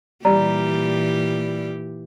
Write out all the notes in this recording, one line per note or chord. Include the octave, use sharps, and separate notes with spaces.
A#2 E3 G3 G4 A#5